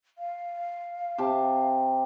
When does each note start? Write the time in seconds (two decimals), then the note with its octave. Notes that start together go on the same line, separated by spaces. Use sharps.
0.18 F5
1.18 C3 G4 A5